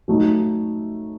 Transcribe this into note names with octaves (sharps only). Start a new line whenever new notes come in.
F#3 A3 D#4